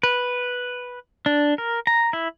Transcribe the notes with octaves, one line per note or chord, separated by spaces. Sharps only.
B4
D4
A#4
A#5
E4